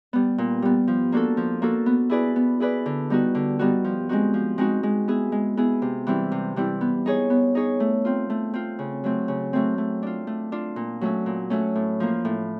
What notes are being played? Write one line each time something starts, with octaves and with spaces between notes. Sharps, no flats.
G3 B3
A#2
G3 B3
F3
A#3 D4 F#4 A4
F3
A#3 D4 F#4 A4
B3
E4 G#4 B4 D5
B3
E4 G#4 B4 D5
D3
G3 B3 D#4 F#4
D3
G3 B3 D#4 F#4
F3
G#3 C4 D#4 F#4
F3
G#3 C4 D#4 F#4
G#3
B3 E4 G#4
G#3
B3 E4 G#4
C3
E3 G3 C4 E4
C3
E3 G3 C4 E4
B3
D#4 G#4 C#5
B3
D#4 G#4 C#5
A3
C4 F4
A3
C4 F4
C#3
F#3 A3 C4
C#3
F#3 A3 C4
A3
D4 F4
A3
D4 F4
A#2
F#3 A3 C#4
A#2
F#3 A3 C#4
A2
F3 A#3
A2